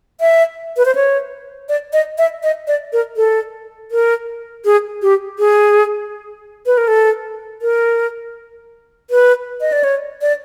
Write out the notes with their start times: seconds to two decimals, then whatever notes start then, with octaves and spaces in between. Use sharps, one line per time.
0.21 E5
0.77 B4
0.86 C5
0.95 C#5
1.69 D5
1.93 D#5
2.18 E5
2.43 D#5
2.68 D5
2.93 A#4
3.17 A4
3.91 A#4
4.65 G#4
5.02 G4
5.39 G#4
6.66 B4
6.77 A#4
6.88 A4
7.62 A#4
9.10 B4
9.61 D#5
9.72 D5
9.84 C#5
10.22 D5